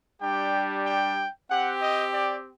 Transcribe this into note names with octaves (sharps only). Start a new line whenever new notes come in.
G3 D4 G4 G5
G5
C4 G4 F#5
D#5
D5